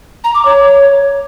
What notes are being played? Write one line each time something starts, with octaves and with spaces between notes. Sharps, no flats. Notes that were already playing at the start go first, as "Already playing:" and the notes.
A#5
D6
C#5